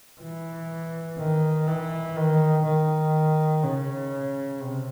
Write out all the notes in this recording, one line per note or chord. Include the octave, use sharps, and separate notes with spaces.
E3
D#3
E3
D#3
D#3
C#3
C3